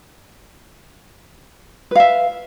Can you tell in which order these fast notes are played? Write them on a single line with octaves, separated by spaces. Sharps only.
B4 F5 E5